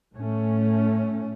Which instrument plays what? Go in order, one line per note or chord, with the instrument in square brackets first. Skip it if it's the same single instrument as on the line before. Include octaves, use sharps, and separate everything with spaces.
[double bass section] A2 A3 C#4